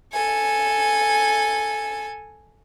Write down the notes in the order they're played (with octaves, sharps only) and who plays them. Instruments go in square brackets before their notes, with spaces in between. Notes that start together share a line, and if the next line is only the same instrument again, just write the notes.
[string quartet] A4 G#5